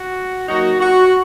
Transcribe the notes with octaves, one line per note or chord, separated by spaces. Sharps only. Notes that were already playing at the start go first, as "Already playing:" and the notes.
Already playing: F#4
F#3 A#3 D#4 F#4
F#4